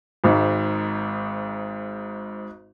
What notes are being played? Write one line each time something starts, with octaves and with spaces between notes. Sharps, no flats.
G#1 G#2